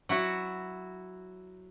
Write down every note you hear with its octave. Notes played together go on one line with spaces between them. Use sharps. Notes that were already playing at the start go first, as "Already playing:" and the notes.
F#3 E4 F#4